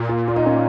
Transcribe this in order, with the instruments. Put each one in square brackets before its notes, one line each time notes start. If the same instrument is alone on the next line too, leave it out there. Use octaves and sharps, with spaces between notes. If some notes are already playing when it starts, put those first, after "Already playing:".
Already playing: [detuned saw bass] A#2
[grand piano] F4
F4
D#4
C#4